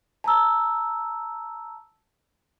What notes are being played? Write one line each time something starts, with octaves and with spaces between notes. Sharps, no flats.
A5 A#5 E6